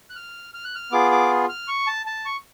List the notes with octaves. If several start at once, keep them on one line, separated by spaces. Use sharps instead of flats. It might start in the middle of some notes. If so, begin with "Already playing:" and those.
F#6
F6
F6
F#6
F6
B3 F4 G#4 D6
D6
F6
C#6
A5
A5
C#6